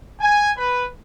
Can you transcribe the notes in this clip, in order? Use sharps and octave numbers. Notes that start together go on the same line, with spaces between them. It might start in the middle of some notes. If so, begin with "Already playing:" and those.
G#5
B4